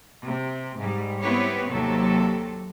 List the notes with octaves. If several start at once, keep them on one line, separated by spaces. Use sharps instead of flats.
C3
G#2 G3
B3 C4 E4 G4 B4 C#5
D#2 C3 F#3 A4